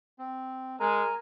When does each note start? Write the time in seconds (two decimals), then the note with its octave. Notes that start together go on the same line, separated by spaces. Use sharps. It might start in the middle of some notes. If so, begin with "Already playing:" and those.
0.19 C4
0.80 G#3 A#4 G#5 A#5